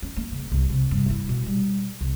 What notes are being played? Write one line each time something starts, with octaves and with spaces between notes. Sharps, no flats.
C#4
A#3
C#3
C2
C3
G2
E4
B2
G3
C2